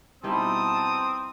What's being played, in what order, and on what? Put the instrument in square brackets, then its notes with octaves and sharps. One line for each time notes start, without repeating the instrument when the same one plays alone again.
[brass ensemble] B2 A5 [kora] G3 D#4 E4 [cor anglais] C4 [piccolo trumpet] D#6